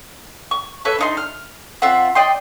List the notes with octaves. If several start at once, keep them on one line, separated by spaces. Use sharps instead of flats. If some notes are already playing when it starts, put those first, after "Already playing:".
C#6
A4 B4 C#5 E5
D4 D#4 C6
F6
C4 F4 E5 F#5
D5 D#5 G5 C6